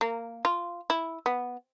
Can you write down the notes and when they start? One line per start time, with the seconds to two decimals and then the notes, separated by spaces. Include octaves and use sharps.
0.01 A#3
0.45 F4
0.90 E4
1.26 B3